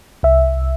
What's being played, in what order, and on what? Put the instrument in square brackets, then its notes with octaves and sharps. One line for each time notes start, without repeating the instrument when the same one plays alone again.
[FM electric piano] C2 E5